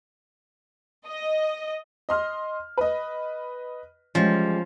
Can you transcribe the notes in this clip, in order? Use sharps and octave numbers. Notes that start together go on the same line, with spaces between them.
D#5
D#5 C6 F6
B4 D#5
E3 F3 G3 G#3 C#4